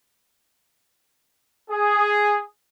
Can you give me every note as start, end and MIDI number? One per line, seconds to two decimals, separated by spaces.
1.70 2.41 68